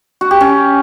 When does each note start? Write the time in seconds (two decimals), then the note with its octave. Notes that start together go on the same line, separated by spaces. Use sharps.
0.21 F#4
0.31 G4
0.41 C#4